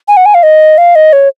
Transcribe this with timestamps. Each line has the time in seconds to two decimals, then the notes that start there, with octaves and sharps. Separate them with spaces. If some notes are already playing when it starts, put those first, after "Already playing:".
0.08 G#5
0.17 F#5
0.26 G#5
0.34 F5
0.43 D#5
0.78 F5
0.95 D#5
1.13 C#5